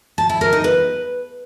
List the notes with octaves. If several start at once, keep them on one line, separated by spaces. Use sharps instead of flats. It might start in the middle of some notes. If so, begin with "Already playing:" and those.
A5
E4
A#4
D#4
B4